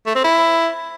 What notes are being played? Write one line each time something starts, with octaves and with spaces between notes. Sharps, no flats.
A3
C4
E4